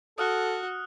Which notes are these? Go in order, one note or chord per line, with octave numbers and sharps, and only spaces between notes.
F#4 A4 D#6 F6 F#6